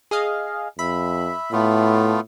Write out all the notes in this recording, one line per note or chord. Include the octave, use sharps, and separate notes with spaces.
G#4 D#5 F5
F2 E5 B5
A2 A3 B3 F4